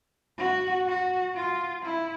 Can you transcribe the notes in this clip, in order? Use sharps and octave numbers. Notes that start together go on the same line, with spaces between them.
F#4
F#4
F4
E4